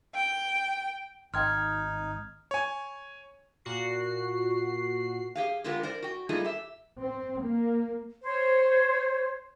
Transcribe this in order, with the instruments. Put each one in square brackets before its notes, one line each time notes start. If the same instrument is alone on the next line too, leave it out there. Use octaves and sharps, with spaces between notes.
[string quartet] G5
[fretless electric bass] G#1 [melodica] D#4 [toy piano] D#5 G5 C6 [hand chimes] F6 G#6
[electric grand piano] C#5 G#5
[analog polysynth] A#2 F#4 C7
[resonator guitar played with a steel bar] G4 G#4 F5
D3 G#3 B3 F4 G4 A#4
A#4 C5 D5
F#4 G5
G3 A3 A#3 D#4 F4 G#4
G4 E5
[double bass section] C4
A#3
[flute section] C5 C#5